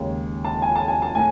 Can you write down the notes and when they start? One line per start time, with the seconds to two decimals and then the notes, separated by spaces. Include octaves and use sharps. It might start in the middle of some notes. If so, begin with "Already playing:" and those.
Already playing: D#2 C#3 G#3 C#4
0.44 A5
0.62 G#5
0.75 A5
0.88 G#5
1.02 A5
1.15 A2 G#5